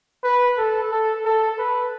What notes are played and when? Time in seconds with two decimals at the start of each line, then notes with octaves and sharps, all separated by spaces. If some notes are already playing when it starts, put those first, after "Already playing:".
0.24 B4
0.58 A4
0.92 A4
1.25 A4
1.58 B4